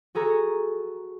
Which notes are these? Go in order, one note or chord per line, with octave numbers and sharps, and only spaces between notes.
F#4 G#4 A4 A#5 C#6